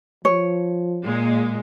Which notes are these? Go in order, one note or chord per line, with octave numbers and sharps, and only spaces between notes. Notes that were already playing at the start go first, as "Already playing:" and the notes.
F3 C#5
A#2 G#3